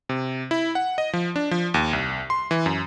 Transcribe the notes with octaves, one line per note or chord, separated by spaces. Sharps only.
C3
E4
F#5
D#5
F3
D4
F3
D#2
C2
C6
E3
F#2